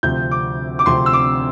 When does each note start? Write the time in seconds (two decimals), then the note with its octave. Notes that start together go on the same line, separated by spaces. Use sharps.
0.03 D2 C3 F3 C4 G6
0.31 D6
0.79 D6
0.86 D2 C3 F3 C4 C6
1.06 E6
1.13 D6